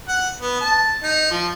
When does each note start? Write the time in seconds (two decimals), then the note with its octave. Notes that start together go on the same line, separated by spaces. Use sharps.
0.08 F#5
0.41 B3
0.60 A5
1.03 D#4
1.31 F3